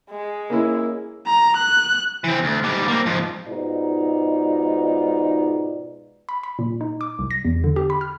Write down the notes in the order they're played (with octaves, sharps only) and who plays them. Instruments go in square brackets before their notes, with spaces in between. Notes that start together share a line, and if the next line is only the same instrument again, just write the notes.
[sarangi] G#3
[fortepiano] A#3 C#4 E4
[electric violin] A#5
F#6
[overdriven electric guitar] E3 C4
D2
G#2 G3
A#3 C4
G#2 F3
[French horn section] G#2 B2 G#3 D#4 F4 D5
[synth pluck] B5
B5
A#2
D#4
D6
C2
A#6
E2
D3
G4
B5
F6